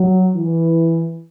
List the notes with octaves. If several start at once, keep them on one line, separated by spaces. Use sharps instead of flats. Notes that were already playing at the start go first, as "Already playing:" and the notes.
Already playing: F#3
E3